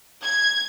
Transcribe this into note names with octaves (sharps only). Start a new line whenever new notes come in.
G#6